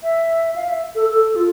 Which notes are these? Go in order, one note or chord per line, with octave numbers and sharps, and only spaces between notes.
E5
F5
E5
A4
A4
F4